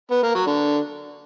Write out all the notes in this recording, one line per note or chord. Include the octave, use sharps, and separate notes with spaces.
B3
A#3
F#3
D3